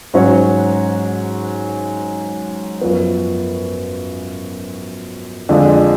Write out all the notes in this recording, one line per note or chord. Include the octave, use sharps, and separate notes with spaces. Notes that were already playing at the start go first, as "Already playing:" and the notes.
G#2 F#3 C#4 F#4 C#5
F#2 F3 B3
F2 D3 G#3 D4 F4